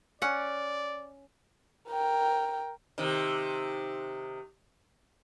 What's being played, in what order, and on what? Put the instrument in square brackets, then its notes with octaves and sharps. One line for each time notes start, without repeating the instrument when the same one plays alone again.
[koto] C#4 F#5 [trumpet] D5
[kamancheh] A#4 G5
[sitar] C3 D#3